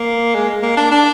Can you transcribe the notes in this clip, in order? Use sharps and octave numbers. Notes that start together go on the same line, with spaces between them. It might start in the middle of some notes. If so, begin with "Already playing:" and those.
Already playing: A#3
G#3
A#3
D4
D4